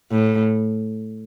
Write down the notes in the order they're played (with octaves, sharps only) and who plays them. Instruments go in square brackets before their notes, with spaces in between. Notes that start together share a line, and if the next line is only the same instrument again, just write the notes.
[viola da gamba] A2